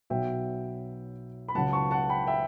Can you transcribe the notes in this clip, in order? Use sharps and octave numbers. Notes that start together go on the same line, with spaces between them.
B1 B2 F#3 B3 E5 G5
B5
C#2 C#3 F#3 F#5 A5
A5 C#6
F#5 A5
G5 B5
E5 G5